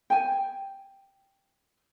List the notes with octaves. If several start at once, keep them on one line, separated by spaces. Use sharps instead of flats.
G5 G#5